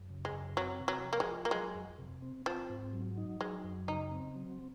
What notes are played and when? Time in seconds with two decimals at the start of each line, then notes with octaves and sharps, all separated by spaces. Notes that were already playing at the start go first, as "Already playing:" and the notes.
Already playing: F#2
0.10 C#3
0.25 G#3
0.32 F#2
0.57 F#3 C4
0.80 C3
0.88 F#3
1.04 F3
1.13 A#3
1.20 G#3
1.28 F4
1.45 A#3
1.51 F#3 G#3
1.75 F2
1.98 C3
2.22 C4
2.46 F3 C4
2.69 G#2
2.93 F#3
3.18 D#4
3.41 F#3 G#3
3.64 F#2
3.88 C#3 D#4
4.11 C4
4.35 F#3